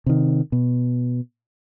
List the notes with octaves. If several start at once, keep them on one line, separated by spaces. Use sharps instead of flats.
C3 D#3
B2